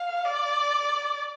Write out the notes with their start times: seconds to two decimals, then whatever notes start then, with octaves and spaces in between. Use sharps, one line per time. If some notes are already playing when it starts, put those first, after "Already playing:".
Already playing: F5
0.25 D5